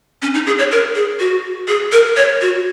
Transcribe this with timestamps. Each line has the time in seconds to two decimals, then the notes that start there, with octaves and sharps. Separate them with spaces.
0.22 C#4
0.34 D#4
0.46 G#4
0.59 C#5
0.71 A#4
0.95 G#4
1.20 F#4
1.68 G#4
1.92 A#4
2.17 C#5
2.41 F#4